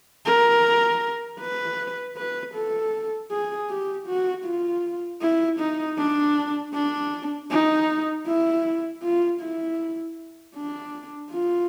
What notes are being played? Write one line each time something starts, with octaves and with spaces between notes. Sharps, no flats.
A#4
B4
B4
A4
G#4
G4
F#4
F4
E4
D#4
D4
D4
D#4
E4
F4
E4
D4
F4